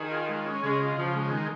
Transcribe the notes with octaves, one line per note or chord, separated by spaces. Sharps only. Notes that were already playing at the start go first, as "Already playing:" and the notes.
Already playing: D#3 G#4
F4
G#3
C#4
C#3 G#3
F4
C#3 F3
G#3
D#3